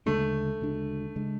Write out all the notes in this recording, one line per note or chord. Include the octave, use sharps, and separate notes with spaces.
D2 C#3 G#3 A3 D4
D2 C#3 G#3 D4
C#3 G#3 D4